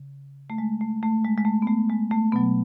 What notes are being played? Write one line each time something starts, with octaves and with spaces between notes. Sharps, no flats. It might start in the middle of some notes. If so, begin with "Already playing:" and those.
Already playing: C#3
A3
G#3
A3
A3
G#3
G#3
A3
B3
A3
G#3
A3
B2 F#3 B3